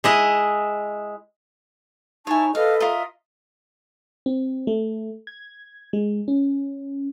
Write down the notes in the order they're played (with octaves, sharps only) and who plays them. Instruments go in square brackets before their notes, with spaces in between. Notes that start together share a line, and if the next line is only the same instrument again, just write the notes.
[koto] G#3 E4 D#5
[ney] D#4 [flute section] E4 A5 C#6 [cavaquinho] C#5 G#5
[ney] A4 [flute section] B4 D#5 [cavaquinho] F5
[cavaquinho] F4 A#4 D#5 [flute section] E5
[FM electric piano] C4
A3
G#6
G#3
C#4